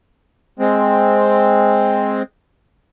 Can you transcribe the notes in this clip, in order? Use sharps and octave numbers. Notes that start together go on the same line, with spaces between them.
G#3 C4